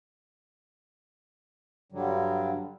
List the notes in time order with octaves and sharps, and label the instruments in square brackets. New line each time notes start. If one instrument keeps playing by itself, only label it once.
[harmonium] G2 D3 F#3 G3